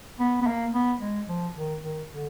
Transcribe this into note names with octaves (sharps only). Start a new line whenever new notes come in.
B3
B3
A#3
B3
G#3
F3
D#3
D#3
D3